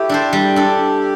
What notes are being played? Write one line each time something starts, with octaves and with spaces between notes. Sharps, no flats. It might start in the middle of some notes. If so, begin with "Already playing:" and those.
Already playing: A3 E4 G4
D4 A4 C5
G3
D4 A4